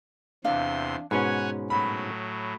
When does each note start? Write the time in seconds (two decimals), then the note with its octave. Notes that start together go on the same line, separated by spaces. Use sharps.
0.44 E2 C3 D4 F5 C6
1.11 G#2 B2 C#4 B4 C#5 F#5 G#5
1.70 A2 F#3 B5